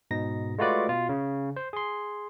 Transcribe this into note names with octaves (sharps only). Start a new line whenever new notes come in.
G#2 B2 D#4 A#6
G#3 A3 F4 F#4 B4 D5
B2 F4
C#3
C5
G#4 C6